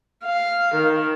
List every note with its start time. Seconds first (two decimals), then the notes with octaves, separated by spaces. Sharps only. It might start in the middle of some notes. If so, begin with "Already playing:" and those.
0.24 F5
0.75 D#3